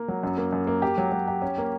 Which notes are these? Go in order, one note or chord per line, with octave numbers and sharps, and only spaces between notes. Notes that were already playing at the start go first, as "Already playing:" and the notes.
Already playing: A#3
F#3
F#2
A#3
F#2
A#3
G4
F#3
F#3
G4
C#4
A#3